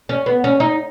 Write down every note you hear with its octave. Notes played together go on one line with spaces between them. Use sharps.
C#4
B3
C#4
D#4